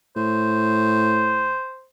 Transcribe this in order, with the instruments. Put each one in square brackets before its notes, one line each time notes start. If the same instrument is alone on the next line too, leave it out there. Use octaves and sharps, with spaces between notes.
[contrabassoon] A2 [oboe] C5